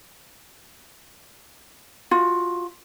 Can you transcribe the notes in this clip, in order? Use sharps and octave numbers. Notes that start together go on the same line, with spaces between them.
F4 F#4